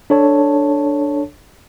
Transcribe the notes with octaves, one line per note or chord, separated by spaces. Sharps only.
D4 A4 C#5 A5